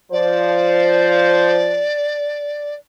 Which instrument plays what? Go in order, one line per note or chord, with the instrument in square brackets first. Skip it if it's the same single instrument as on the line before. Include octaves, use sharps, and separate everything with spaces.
[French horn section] F3 C5 [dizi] D5